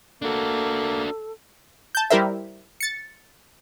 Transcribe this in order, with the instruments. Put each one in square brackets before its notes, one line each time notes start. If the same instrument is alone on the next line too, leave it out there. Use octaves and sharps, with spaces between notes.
[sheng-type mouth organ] A#3 [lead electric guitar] D4 F#4 [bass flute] A4
[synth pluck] A5 G6
G3 E4 G4 A#4 C5 E5
A6 C#7